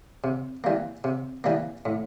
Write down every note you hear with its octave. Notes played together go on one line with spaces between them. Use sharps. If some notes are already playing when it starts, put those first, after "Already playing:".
C3
E3 G3 A#3
C3
E3 G3 A#3
A2